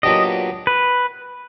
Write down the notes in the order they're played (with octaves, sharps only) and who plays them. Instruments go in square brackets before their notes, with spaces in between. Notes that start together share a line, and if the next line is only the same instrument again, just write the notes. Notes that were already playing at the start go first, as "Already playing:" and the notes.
[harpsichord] A#2 F#3 B3 D4 G4 [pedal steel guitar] D#5
[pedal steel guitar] B4